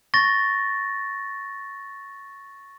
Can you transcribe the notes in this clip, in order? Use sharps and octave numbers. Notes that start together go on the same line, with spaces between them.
C#6 A6 A#6